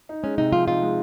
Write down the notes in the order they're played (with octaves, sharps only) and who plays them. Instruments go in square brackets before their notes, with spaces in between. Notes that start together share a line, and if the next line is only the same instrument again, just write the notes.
[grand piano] D#4
[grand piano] G#3 [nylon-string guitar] C#4
[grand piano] C3 [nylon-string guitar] D#4
[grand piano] F3 [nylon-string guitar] F4
[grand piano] D#4 [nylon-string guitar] F4
[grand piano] G#3